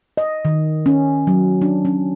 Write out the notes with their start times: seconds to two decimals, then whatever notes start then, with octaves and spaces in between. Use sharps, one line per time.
0.17 D#5
0.45 D#3
0.86 C#4
1.27 F#3
1.62 D4
1.85 C#4